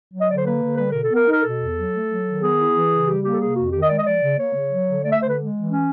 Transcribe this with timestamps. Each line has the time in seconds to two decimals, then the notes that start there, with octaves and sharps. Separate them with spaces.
0.12 F#3
0.20 D#5
0.27 D3 D5
0.37 C5
0.44 A#3 B4
0.61 D3
0.77 G3 B4
0.91 B2 A#4
1.03 A4
1.09 B3
1.15 A#4
1.27 D#4
1.32 A#4
1.42 B2 A4
1.59 E2
1.75 F#3
1.93 A3
2.09 F#3
2.25 D#3
2.41 B3 G#4
2.57 E4
2.74 E3
2.91 C#3
3.06 G3 G4
3.23 A#3 G4
3.32 A4
3.39 C3 G#4
3.56 F2 F#4
3.72 D#3 G4
3.81 D#5
3.89 G#3 D5
3.97 D#5
4.05 F3 D5
4.21 C#3
4.38 A#3 C#5
4.55 C#3
4.70 F#3
4.87 D3
5.03 A3 D5
5.11 E5
5.20 D3 C5
5.28 B4
5.36 G#3
5.53 E3
5.69 C#4